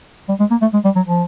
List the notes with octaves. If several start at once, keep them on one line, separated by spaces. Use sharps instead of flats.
G3
G#3
A#3
A3
G#3
G3
F#3
F3